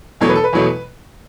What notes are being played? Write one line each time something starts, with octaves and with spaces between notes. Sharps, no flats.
E2 B2 F#3 A3 C#5
B4
A4
B4
E2 B2 F#3 A3